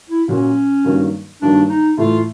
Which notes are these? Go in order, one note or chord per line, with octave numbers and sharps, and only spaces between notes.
E4
A#2 F#3 A#3 C#4
G2 D#3 F#3 A#3
G2 D#3 F#3 A#3 D4
D#4
A2 E3 A3 F4